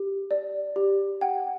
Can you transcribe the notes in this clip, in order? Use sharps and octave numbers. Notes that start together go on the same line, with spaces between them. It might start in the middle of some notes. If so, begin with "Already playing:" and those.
Already playing: G4
D5
G4
F#5 G5